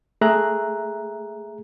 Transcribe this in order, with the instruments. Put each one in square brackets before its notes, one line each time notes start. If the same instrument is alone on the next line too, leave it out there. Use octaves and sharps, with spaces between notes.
[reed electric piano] A3 G#4 E5 A#5 F#6